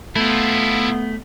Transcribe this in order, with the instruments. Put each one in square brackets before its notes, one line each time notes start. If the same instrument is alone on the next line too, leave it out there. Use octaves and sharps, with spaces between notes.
[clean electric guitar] A3 [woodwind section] B3 [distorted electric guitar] E4 F4